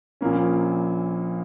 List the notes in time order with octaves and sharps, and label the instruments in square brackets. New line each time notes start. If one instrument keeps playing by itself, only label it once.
[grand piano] A#1 A#2 A#3 C#4